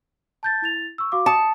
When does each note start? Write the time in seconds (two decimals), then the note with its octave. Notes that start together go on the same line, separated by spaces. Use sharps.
0.43 A5 G6 A6
0.62 E4 A6 F7
0.98 C#6 E6
1.12 F#4 F5 D6
1.26 A5 D#6 C#7